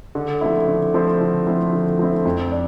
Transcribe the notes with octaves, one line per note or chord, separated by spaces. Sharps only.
D3
F3 A3 C4 E4
D3
F3 A3 C4 E4
D3
F3 A3 C4 E4
D3
F3 A3 C4 E4
F2
D4